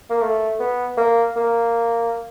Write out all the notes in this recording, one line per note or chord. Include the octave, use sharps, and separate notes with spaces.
A#3
A3
B3
A#3
A#3